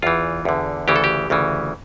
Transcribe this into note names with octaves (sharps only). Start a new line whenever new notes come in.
E2 E3 F4
E2 D3
D2 C#3 E3 G4
A4
G4
D2 C#3 E3